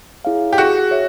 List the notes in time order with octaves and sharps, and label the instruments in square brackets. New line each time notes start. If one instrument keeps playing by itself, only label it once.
[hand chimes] E4 G#4 C#5 F5
[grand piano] G4
[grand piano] F#4 [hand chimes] G#4
[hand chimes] C#5 E5